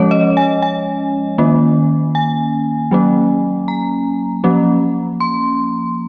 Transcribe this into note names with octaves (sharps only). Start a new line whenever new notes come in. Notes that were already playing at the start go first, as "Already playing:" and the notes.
Already playing: F3 G#3 C#4 C#5
D#5
G#5
G#5
D#3 A#3 C#4
G#5
F#3 A#3 C#4
A#5
F3 A#3 C#4
C6